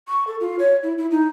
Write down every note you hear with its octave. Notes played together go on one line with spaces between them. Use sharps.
C#6
A4
F4
C#5
E4
E4
D#4